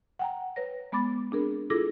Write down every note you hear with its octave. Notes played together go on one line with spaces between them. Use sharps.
F#5 G5 A#5
B4 C#5 A#6
G#3 B3 B5 D6 A6
C4 D4 G#4 A#4
E4 F4 G#4 A4 D6 A#6